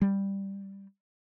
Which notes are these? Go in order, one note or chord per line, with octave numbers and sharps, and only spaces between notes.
G3